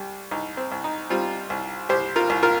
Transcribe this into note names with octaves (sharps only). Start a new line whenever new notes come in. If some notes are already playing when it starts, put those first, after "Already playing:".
Already playing: C2 G3
C2 D#4
C4
C2
D#4
G3 C4 F4
C2
C2 G4 C5
F4 A#4
C2
F4 A#4